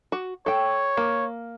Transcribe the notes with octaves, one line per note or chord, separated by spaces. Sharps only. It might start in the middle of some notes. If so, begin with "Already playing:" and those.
F#4
A4 C#5 G5
A#3